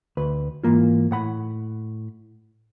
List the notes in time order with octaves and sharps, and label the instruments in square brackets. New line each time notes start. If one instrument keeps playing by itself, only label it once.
[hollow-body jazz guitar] D2 B4
G#2 E3 A#3 F4
A2 F#5 B5